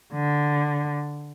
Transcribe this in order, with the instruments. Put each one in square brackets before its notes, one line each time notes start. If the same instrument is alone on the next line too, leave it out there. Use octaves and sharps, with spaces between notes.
[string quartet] D3